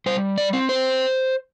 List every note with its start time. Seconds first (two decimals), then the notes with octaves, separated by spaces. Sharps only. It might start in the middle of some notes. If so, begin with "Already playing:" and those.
0.06 G3 C5
0.38 D5
0.53 C4
0.69 C5